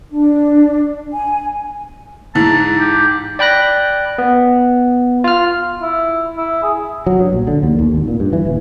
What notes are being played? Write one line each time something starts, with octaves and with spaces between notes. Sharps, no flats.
D4
G#5
G#2 E3 A5
G4
D5 G5 B5 F#6 A#6
B3
F4 F6
E4
E4
G#4
F#3
G2
A#1
D3
D#2
D#2
G#1
A#2
G2
E3
D#1